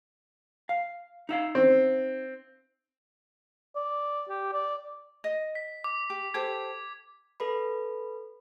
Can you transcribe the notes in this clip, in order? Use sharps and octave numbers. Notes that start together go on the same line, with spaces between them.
F5
D#4 E5 F5
C4
D5
G4
D5
D#5
B6
D6
G4
G4 A4 C5 G#6
A4 B4 B5